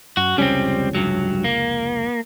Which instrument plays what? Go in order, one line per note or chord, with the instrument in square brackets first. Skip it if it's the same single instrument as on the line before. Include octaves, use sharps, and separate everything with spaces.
[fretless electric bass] F#2 [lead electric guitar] F#4
[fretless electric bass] F1 C#2 C#4 [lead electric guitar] G3 C4
[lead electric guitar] G2 F#3
A#3